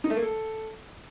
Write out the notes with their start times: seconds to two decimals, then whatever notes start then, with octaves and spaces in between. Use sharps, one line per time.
0.04 D#4
0.10 A3
0.16 A#3
0.22 A4